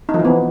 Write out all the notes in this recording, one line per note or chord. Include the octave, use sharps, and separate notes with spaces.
D#4
F3
E3
B3